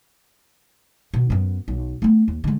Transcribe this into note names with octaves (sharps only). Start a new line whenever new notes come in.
B2
F#2 B3
B1
A3 B3
D#2
D3 G#3